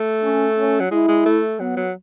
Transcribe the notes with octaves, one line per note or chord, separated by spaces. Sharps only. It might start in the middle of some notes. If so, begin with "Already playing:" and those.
Already playing: A3
C#4
C#4
F#3
G#3 E4
G#3
A3
F#3 B3
F#3